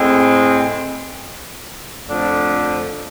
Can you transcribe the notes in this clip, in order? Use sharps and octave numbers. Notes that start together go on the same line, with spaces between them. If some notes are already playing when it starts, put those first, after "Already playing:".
Already playing: A2 G#3 C4
F2 D3 F3 A3 D4